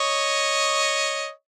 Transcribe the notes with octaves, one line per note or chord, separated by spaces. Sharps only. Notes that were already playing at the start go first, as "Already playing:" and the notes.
Already playing: C#5 D#5